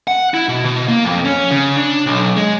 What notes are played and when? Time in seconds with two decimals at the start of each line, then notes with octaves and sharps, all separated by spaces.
0.07 F#5
0.34 E4
0.49 B2
0.65 B2
0.88 A#3
1.05 F2
1.25 C#4
1.51 C#3
1.76 D4
2.06 B1
2.37 G#3